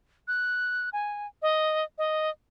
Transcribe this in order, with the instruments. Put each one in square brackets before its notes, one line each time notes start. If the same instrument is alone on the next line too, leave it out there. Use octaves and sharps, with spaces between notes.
[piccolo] F#6
G#5
D#5
D#5